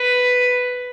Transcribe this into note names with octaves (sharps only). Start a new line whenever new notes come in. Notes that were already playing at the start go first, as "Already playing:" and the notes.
Already playing: B4